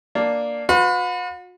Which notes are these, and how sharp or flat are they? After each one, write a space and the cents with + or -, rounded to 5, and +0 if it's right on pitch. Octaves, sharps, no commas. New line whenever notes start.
A#3 +0 D4 +0
F#4 -45 B4 +25